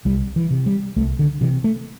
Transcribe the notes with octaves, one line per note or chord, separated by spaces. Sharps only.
C2 G3
E3
C3
G3
C2 A3
D3
C3 E3
A3